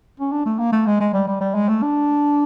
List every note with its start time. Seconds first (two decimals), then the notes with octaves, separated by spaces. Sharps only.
0.20 C#4
0.32 D4
0.46 A3
0.59 A#3
0.72 A3
0.86 G#3
1.00 G#3
1.14 G3
1.27 G3
1.41 G3
1.55 G#3
1.68 A3
1.82 D4